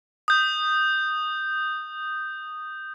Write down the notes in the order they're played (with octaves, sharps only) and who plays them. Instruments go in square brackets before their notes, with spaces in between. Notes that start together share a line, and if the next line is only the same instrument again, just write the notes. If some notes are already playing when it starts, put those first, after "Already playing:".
[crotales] D#6 G6